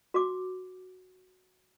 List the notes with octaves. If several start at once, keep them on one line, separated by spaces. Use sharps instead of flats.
F#4 D6